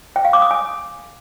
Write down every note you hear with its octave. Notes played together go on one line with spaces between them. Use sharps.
G5
F5
D6
D#6
G#5